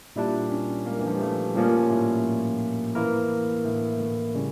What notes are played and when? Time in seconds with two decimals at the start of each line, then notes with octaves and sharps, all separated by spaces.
0.16 A#2 G3 D4 E4
0.50 C#4
0.86 A#3
0.99 E3
1.07 F3
1.14 G3
1.21 A3
1.55 A#2 F3 G3 A#3 C#4
1.90 A2
2.95 E3 A#3 E4 A#4
3.64 A2
3.99 A2
4.35 C#3 G3 C#4